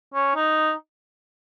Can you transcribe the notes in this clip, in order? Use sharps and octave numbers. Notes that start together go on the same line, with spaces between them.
C#4
D#4